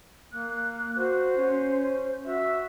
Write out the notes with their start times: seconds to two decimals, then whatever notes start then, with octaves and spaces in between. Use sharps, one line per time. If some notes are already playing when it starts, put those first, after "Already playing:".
0.33 A#3 F#6
0.96 F#4 C5
1.37 C#4
2.25 F#4 E5